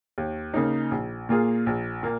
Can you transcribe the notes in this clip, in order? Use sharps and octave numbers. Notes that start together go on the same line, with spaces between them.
D#2
C#3 A#3 D#4
A#1
A#2 A#3 F4 G#4
A#1
A#2 A#3